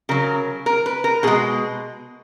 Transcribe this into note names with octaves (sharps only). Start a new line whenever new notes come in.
C#3 F#3 A#4
A#4
B4
A#4
B2 G#3 G#4